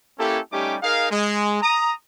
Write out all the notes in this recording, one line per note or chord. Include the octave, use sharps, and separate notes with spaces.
A#3 C#4 E4 G4 A4
G3 A3 C#4 D#4 G4 D6
D#4 G#4 A#4 F5
G#3
A#5 D#6